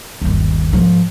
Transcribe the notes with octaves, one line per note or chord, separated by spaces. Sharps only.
G1 D#2
G#2 F3